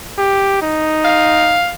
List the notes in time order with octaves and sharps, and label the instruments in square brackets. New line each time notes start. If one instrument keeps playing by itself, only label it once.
[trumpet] G4
D#4
[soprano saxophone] F5